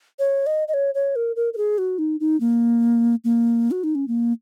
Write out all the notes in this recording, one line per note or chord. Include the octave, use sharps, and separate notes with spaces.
C#5
D#5
D#5
C#5
C#5
A#4
A#4
A#4
G#4
F#4
D#4
D#4
A#3
A#3
F#4
D#4
C#4
A#3